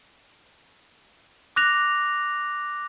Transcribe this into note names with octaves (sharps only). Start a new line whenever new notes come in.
D6 F#6 A#6 F7